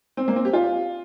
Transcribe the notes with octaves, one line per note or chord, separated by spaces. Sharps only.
C4
A#3
C4
G4
F4